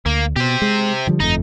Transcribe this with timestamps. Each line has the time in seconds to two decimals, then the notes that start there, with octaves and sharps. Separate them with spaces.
0.06 D2 A#3
0.36 B2 G4 C5
0.62 G#3
1.07 D3 F3 G3
1.20 G1 F2 A3 D#4